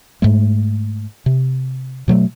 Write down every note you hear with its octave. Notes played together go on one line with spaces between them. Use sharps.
G#2 G#3 A3
C3
B2 F#3 G3 A3